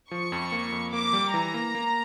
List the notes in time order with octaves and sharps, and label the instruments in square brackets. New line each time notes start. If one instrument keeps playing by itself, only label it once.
[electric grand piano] F3 [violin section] C#6
[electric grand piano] F2
A#3
F2
[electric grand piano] A#3 [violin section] D6
[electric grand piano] G3
[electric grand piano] E3 [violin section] A#5
[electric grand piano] A#3
A#3